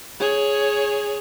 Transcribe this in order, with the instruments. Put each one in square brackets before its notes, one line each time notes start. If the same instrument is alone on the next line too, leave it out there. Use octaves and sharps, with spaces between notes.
[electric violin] G#4 C#5